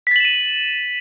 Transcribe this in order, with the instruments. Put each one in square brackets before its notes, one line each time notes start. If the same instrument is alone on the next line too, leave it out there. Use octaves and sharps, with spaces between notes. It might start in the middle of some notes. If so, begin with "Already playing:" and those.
[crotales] B6
A6
F#7
E7
D#7